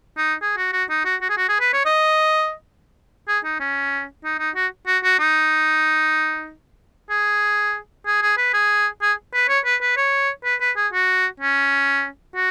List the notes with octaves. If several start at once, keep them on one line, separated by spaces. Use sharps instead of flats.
D#4
G#4
F#4
F#4
D#4
F#4
F#4
G#4
F#4
G#4
B4
C#5
D#5
G#4
D#4
C#4
D#4
D#4
F#4
F#4
F#4
D#4
G#4
G#4
G#4
B4
G#4
G#4
B4
C#5
B4
B4
C#5
B4
B4
G#4
F#4
C#4
F#4